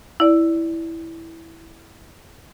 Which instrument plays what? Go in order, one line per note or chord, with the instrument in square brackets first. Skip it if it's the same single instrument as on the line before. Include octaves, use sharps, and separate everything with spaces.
[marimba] E4 D5